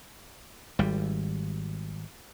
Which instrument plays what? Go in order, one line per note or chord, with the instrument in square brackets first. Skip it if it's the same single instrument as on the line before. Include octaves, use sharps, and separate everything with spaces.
[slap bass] G#1 G3